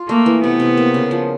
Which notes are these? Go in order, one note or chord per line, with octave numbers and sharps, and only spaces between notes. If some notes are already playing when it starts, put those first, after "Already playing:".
Already playing: F4
A3 A#3
E3
C3 B3
C3
A#3
C#3
F3